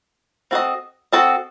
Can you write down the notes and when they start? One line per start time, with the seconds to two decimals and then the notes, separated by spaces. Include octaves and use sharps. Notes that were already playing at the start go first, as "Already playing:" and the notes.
0.51 C4 F#4 A4 D#5
1.13 C4 F#4 A4 D#5